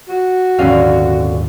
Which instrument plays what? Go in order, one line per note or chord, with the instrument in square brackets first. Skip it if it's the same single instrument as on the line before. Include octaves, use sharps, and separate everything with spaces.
[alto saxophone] F#4
[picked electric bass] D#1 G#1 D#2 [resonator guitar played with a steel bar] D3 C#4 F5